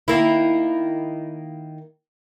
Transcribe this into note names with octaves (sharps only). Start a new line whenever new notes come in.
D#3 A#3 E4